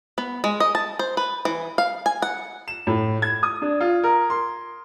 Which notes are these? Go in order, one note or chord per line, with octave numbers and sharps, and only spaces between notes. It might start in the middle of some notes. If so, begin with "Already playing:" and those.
B3
G#3
D#5
A5
C5
B4
E3
F5
G#5
F#5
E7
A2
G#6
D#6
D4
F4
A#4
C6